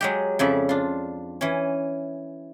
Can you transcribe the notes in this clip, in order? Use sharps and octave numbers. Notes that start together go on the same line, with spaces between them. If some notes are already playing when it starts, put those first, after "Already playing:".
F#3 G#3 G4
F2 C#3 D5 E5
D4 F4
E3 C#4